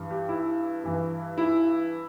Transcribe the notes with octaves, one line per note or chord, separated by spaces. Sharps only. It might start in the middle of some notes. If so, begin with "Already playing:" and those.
Already playing: G2 E3
G4
E4
G2 E3
E4